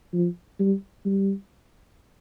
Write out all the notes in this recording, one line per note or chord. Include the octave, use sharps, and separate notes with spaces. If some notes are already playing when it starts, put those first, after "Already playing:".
F3
G3
G3